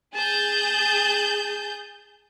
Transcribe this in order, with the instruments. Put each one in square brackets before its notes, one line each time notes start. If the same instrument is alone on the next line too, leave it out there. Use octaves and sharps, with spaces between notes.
[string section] G#4 G6 [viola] A5